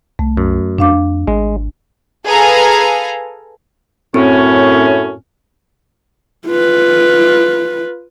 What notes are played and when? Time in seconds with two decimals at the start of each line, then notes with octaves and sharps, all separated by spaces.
0.19 C2 A3
0.37 F#2
0.78 F2 D4 F5 D6
1.27 G#1 G#3
2.26 G#4 A4 B4 F5 G#5 A#5
4.14 F#2 A2 C4 C#4
6.46 F4 B4